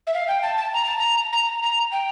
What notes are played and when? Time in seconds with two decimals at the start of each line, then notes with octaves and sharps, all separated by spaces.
0.07 E5
0.14 F5
0.28 G5
0.43 A5
0.57 A5
0.73 A#5
0.86 A5
0.99 A#5
1.33 A#5
1.62 A#5
1.91 G5